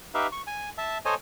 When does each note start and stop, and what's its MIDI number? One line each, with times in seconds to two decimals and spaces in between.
0.14 0.27 63
0.14 0.27 67
0.14 0.27 71
0.14 0.27 76
0.14 0.27 77
0.32 0.41 85
0.47 0.69 80
0.78 0.98 76
0.78 0.98 81
1.05 1.14 69
1.05 1.14 72
1.05 1.14 73
1.05 1.14 75
1.05 1.14 80